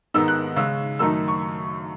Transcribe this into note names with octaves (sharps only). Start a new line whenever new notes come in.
G#2 D#3 G#3 B3 D#4 E6
F#6
C#3 G#3 C#4 E6
F#2 D#3 A3 D#4 E6
C#6